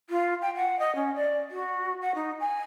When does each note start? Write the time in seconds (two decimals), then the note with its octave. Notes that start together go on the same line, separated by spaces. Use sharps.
0.10 F4
0.42 G5
0.55 F#5
0.79 D#5
0.95 C#4
1.15 D5
1.51 F#4
2.02 F#5
2.15 D#4
2.40 G#5